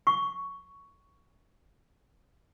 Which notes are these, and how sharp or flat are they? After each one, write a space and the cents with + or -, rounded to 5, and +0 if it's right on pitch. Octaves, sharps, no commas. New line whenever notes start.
C#6 +5